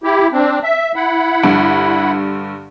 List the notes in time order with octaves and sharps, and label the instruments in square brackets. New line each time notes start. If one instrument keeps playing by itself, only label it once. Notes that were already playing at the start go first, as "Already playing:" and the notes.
[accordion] E4 G4
C4 D4
E5
E4 F#5 B5
[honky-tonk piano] G2 D3